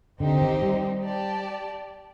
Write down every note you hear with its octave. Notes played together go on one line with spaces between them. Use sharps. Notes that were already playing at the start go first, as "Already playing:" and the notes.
D3 C4 D#4 G4 C5
D#3
G3
G4 D5 A5